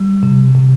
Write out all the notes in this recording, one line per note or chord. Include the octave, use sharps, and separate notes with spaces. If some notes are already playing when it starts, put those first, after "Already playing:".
Already playing: G3
C3
C3